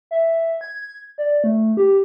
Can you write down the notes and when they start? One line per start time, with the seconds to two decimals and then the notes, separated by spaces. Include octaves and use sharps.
0.11 E5
0.61 G#6
1.18 D5
1.44 A3
1.77 G4